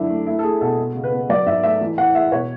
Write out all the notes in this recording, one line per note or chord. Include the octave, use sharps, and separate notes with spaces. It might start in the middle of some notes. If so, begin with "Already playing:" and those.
Already playing: F#2 D3 D4 E4
A3
A3 E4
A4
A3 G#4
B2 A4
G#3
C#3
B4
B3
F#3 D5
G#2 E5
A3 E5
E3
A2 F#5
G#3 E5
B2 C#5